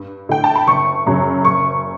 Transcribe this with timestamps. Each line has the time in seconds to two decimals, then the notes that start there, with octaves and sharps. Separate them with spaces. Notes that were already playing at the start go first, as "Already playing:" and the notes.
Already playing: G2
0.29 D3 A3 E4 G5
0.44 A5
0.55 B5
0.67 F#1 C#6
1.06 F#2 C#3 F#3
1.45 F#1 C#6